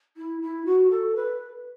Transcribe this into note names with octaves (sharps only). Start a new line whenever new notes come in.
E4
E4
F#4
A4
B4